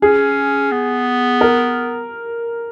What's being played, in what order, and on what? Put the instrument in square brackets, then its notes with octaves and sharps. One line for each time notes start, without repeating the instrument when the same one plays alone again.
[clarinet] C#4 [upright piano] G#4
[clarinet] B3
[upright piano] A#4